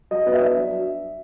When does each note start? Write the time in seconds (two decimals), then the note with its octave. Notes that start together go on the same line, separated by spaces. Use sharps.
0.11 F#3 D#5
0.26 B3 D#5
0.34 E5
0.41 D4
0.57 F#3